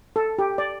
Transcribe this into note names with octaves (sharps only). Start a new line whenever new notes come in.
A4
G4
D5